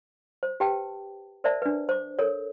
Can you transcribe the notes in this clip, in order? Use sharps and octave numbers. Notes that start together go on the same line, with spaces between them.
C5
G4 B4 G5 A5
A#4 C5 D5 E5 A5
D4 B4
C5 D6
A4 A#4 C#5